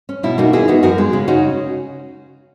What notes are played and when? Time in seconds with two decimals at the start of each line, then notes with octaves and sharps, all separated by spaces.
0.09 C#4
0.23 B2 E4
0.38 A#3 D#4 F#4
0.53 D#3 E4 G#4
0.68 B3 D#4 F#4
0.83 F#2 F#4 A#4
0.98 G#3
1.13 C#3
1.28 C#4 D#4 F#4